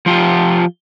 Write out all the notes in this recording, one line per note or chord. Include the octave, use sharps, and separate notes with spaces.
F3 F4 G4